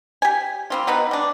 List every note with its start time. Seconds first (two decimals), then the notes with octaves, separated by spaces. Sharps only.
0.22 G4 G#5
0.70 G3 C4 F4
0.87 B2 B3 D#4 B4
1.11 G3 D4